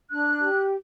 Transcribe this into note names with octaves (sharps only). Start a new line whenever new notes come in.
D4 F#6
G4